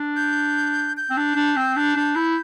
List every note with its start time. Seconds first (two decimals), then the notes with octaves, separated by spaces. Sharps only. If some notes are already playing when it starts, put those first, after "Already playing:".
Already playing: D4
0.16 G6
0.97 G6
1.10 C4
1.17 D4
1.36 D4
1.56 C4
1.76 D4
1.96 D4
2.16 E4